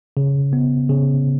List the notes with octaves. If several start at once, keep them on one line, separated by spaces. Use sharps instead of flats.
C#3
B3
C#3